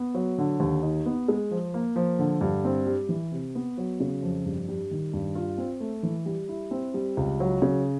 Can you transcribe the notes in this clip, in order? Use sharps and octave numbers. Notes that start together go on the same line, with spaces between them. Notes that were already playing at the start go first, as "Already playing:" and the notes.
Already playing: B3
F#3
D3
D#2
D#4
B3
G#3
F3
A#3
F3
D3
G2
C4
G3
E3
C3
B3
F#3
C#3
F2
G2
G3
D#3
G2
F4
C4
A3
E3
G3
E4
C4
G3
C#2
F#3
C#3